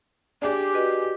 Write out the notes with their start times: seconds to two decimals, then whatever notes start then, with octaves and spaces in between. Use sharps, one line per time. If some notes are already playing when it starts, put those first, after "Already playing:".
0.42 D4 G4 G#4 D5
0.73 F#4 B4 D#5